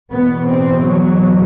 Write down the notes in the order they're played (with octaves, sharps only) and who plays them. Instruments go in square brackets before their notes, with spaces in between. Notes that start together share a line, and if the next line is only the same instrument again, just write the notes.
[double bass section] E2 B2 B3
C4
F#3